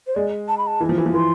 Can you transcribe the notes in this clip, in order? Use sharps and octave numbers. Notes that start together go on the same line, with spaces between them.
C5
G#3 D5
A5
B5
A5
E3
F3
E3
F3
E3 C6